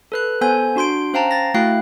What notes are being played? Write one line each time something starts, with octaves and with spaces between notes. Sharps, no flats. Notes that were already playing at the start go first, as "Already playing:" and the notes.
A4 B4 F#6
B3 A4 C5 G#5 G6
D4 F#4 C6 G6 D7
C#4 C5 F5 G5 A5 A#5
A6 A#6
A3 E4 F#4 F5 G5 F#6